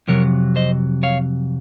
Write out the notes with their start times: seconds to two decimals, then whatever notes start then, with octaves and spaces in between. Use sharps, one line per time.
0.08 F2 C3 F#3 A#4 C#5
0.56 C5 D#5
1.03 C#5 F5